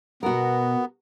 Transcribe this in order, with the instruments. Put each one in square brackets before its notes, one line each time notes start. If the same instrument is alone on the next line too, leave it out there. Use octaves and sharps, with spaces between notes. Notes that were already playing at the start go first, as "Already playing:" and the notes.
[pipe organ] B2 [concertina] B3 [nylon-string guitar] F#4 A#4